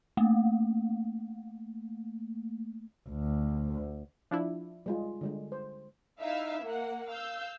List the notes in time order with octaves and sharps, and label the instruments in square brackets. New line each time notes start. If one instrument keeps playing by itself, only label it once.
[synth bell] A3 A#3
[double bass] D2
[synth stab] F3 D4 E4
[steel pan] G3 G#3 F4
D3 G3 G#3
C5
[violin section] D#4 E4 E5 F5
A#3 F#5
F5 E6 G6